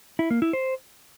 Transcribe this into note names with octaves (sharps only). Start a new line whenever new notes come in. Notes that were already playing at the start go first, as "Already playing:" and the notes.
E4
A#3
E4
C5